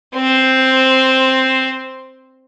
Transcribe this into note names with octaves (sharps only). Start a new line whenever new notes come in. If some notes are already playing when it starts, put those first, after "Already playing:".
C4 C5